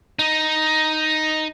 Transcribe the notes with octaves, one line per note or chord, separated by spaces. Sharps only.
D#4